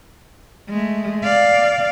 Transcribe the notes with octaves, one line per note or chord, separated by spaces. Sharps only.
G#3 A3
D5 F5